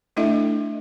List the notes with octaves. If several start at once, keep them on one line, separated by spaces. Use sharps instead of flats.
A3 D4 E4 A4 D#5 E5